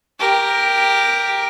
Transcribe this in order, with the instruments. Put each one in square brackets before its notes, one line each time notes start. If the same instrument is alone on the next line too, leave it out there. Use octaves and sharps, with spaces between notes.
[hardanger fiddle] G4 A#4